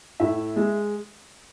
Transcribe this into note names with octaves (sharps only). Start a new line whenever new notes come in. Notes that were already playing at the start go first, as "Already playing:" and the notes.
A2 E5
G#3